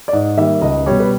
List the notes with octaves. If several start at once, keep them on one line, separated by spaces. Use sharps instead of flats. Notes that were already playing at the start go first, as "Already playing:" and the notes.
D5
G#2 D#5
D#3 G3 A#3 E5
C#2 D#5
B2 G3 C#5
B4